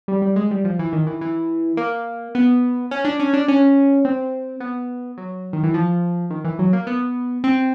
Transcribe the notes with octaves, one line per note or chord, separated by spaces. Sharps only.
G3
G3
G#3
G3
F3
E3
D#3
E3
E3
A#3
B3
C#4
D4
C#4
D4
C#4
C4
B3
F#3
D#3
E3
F3
D#3
E3
F#3
A#3
B3
C4